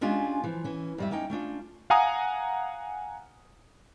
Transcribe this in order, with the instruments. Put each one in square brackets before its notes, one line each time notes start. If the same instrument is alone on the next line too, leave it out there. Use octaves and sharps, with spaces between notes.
[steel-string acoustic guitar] G#3 C#4 D4 F4 G4 G#5
E3 F3
E3 C#4
F2 G3 E5
A#3 C#4 D#4 G5
A3 C#4 D4 F4
[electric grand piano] F5 F#5 G#5 A#5 D#6